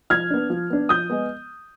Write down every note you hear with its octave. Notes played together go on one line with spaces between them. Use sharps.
F3 F6 G#6
B3 D4
F3
B3 D4
F3 D#6 G6
G#3 B3